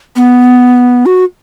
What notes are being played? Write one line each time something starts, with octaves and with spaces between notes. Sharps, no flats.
B3
F#4